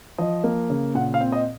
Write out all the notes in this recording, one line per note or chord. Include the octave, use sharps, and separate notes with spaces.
F3 D#5
A#3
C#3
A#2 F#5
F5
C4
D#5